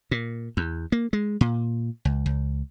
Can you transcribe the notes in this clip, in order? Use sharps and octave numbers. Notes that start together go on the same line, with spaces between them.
A#2
E2
A#3
G#3
A#2
C#2
C#2